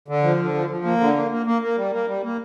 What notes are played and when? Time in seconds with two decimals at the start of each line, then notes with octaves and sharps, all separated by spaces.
0.08 D3
0.23 F3
0.39 D3
0.54 F3
0.70 F3
0.85 A#3
1.00 D3
1.16 A#3
1.31 A#3
1.46 A#3
1.62 A#3
1.77 G3
1.92 A#3
2.08 G3
2.23 A#3